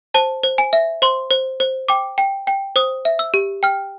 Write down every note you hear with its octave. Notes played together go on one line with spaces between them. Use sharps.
C5 A5
C5
G#5
E5
C5 C6
C5
C5
G5 D6
G5
G5
C5 D#6
E5
E6
G4
G5 F6